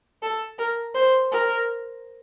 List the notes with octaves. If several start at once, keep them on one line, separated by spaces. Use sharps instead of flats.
A4
A#4
C5
A#4